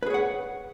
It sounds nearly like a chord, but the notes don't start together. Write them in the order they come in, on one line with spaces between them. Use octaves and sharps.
B4 G#4 C#5 F#5